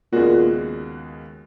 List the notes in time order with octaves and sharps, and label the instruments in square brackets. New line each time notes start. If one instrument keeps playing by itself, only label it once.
[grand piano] D#2 C#3 G#3 B3 F#4 [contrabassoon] A#2